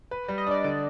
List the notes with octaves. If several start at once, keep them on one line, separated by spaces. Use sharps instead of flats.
B4
G3
D#5
D4 D5
D3 D5